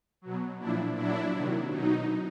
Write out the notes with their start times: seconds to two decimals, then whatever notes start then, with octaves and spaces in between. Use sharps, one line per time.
0.21 B2 F#3
0.59 A#2 F3 D4 E4
0.96 A#2 F#3 D4 E4
1.33 C3 D#3 F#3
1.70 B2 F#3 D#4